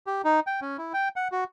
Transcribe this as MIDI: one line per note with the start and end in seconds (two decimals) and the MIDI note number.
0.07 0.22 67
0.24 0.40 63
0.47 0.60 79
0.62 0.77 61
0.78 0.93 64
0.94 1.09 79
1.16 1.28 78
1.32 1.44 66